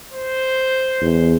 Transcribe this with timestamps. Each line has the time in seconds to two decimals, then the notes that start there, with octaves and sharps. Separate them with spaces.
0.13 C5
1.01 E2